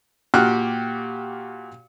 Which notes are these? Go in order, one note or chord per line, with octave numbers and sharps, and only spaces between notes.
A#2 F#4 G4 F6 F#6